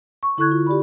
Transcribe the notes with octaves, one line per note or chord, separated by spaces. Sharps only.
C#6
D3 E4 A4 C#6 F#6 G#6
F4
G4 D5 B5